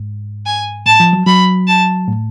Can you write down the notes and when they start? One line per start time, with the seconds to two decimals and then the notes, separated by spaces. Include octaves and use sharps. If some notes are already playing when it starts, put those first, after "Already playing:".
Already playing: G#2
0.46 G#5
0.86 A2 A5
1.00 F3
1.13 F#3
1.26 F#3 B5
1.68 A5
2.08 A2